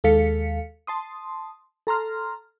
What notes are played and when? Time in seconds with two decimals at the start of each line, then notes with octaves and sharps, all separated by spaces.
0.04 D#2 G#3 A4 F5 B6 C#7
0.87 A5 C6 D#6
1.87 A4 A#5 C6 F6